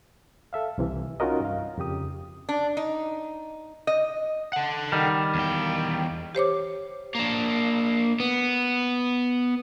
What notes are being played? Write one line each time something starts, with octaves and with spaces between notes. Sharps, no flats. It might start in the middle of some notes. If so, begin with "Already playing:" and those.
A4 E5 F5
C2 C3 E3
C#4 D#4 F4 F#4 A#4 D#5
G2 F5
F2 C#3 G4 D#6
D4
D#4
D#5
A4 F#5
D#3 G3
E2 G5
G4 C5 C#5 D6
A#3 D4
B3